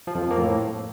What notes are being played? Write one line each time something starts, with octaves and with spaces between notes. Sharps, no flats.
F3
F2
F3
A#3
A2